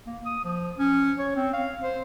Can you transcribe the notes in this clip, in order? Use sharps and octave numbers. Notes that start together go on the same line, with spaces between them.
A#3
D#6
F3
C#4
C#5
C4
F5
C5